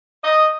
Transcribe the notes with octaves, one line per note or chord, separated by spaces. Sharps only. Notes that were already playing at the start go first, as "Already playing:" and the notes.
D#5